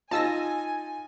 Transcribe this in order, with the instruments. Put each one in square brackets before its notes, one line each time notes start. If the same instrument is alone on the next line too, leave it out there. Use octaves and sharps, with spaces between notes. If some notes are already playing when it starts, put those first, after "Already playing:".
[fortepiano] D#4 F4 [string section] G#5 [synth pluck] A5 E6 A#6